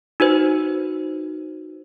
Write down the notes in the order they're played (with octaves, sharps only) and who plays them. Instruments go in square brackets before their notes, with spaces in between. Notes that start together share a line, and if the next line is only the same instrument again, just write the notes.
[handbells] D#4 F#4 B4 C5